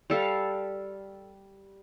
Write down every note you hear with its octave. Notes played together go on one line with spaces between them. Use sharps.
G3 A4 F5